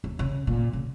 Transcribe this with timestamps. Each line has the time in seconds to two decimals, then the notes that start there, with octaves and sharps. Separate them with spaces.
0.04 D#2
0.19 C#3
0.47 A#2
0.73 C#3